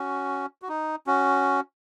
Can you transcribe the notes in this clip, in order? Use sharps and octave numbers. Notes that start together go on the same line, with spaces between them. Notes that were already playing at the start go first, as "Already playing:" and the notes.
Already playing: C#4 F#4
F#4
D#4
C#4 F#4